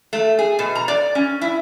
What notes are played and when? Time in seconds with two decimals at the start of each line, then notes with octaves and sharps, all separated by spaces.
0.13 A3
0.39 G#4
0.59 B2
0.75 A#5
0.88 D5
1.15 C#4
1.41 E4